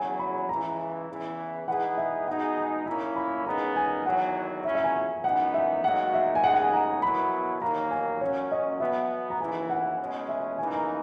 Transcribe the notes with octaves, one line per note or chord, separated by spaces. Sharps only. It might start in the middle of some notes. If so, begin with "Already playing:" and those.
Already playing: E2 C#3 F#3 G#5
B5
C#2 C#3 E3 A#5
E2 C#3 E3
E3 G#3 D#4 G#4 B4 F#5
E5
B2 G#3 D#4 G#4 F#5
G#5
A#2 A#3 C#4 E4 A#5
B5
C#3 G#3 B3 D#4 A#4 A#5
G#5
E2 D#3 F#3 F#5
C#2 C#3 F#3 C#4 E4 E5
E5
G#5
F#2 E3 G#3 B3 D#4 F#5
E5
G#2 F#3 A#3 D#4 F#4 F#5
E5
G#5
D#2 C#3 G#3 D#4 G#4 F#5
F#5
G#5
A#5
B2 F#3 B3 E4 A#4 B5
D#2 D#3 F#3 A#3 A#5
G#5
A#2 F#3 C#4 C#5
D#5
B2 F#3 B3 E5
A#5
D#2 C#3 E3 G#5
F#5
B2 G#3 C#4
E5
C#3 E3 A#3 D#4 A#4 G#5
A#5